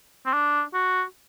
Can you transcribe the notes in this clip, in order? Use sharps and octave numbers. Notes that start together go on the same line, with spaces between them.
C4
D4
F#4